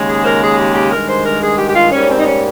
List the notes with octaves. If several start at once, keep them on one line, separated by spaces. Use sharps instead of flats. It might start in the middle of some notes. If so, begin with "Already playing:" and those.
Already playing: D#2 C#3 G#3
G#4
C5
A#4
G#4
G4
G4
G2 D#3 G#3 A#4
C5
A#4
G#4
G4
G4
F4
G#2 G3 A#3 C#4
C4
D#4
C#4